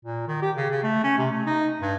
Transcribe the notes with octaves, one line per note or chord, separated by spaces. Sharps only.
A#2
D#3
G4
C#3
C#3
A3
C#4
C3
A3
D#4
G2